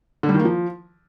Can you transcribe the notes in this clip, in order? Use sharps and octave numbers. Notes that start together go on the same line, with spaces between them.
D3
G3
D#3
A#3
F3